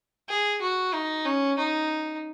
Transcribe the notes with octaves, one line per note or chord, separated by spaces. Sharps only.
G#4
F#4
D#4
C#4
D#4